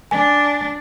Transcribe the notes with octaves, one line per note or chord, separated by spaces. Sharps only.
D4 G#5